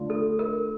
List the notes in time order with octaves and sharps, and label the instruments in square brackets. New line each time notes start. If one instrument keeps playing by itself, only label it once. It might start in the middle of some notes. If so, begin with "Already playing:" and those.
Already playing: [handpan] D3 A3 D4 F4
[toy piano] A4
A#4